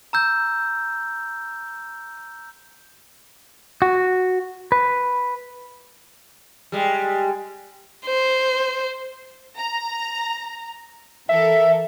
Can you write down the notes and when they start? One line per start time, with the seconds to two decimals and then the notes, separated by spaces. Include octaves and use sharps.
0.13 A#5 E6 G6
3.82 F#4
4.72 B4
6.72 G3 G#3
8.06 C5
9.57 A#5
11.29 E3 A4 A#4 E5